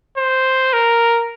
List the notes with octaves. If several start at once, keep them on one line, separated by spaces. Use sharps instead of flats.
C5
A#4